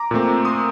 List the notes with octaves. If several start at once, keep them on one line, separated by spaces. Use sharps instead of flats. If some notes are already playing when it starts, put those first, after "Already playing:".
Already playing: A#5 D6
A#2 A3 C4
C6 D#6